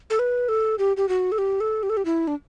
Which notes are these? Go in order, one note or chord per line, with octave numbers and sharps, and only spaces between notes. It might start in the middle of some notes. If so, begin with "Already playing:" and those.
A4
B4
A4
G4
G4
F#4
A4
G4
A4
G4
A4
G4
E4
D4